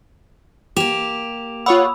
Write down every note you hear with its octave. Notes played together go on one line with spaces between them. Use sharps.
A#3 G4 D6 E7 F7
F4 C#5 F#5 B5 D#6 E6